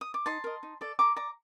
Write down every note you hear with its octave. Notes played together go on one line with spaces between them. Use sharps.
D#6
D6
D#4 A5 C6
A#4 D#5
D#4
A4 D5
A4 A#5 D6
D5 A#5 D6